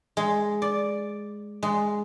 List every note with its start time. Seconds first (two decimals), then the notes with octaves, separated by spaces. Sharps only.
0.17 G#3
0.62 D5
1.63 G#3